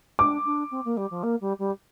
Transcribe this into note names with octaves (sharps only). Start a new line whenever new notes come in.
D4 D6
D4
C4
A#3
G3
F3
A#3
G3
G3